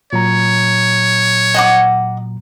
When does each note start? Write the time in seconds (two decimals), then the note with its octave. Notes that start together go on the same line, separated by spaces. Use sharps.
0.13 A#2 F#3 C#5 A#5
1.54 D#5 F#5 D6